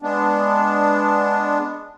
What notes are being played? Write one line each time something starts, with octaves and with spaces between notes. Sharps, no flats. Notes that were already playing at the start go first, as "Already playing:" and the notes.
G#3 B3 D4